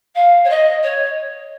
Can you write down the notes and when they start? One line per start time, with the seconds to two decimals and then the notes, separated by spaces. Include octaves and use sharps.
0.15 F5
0.44 C#5
0.49 D#5
0.83 C#5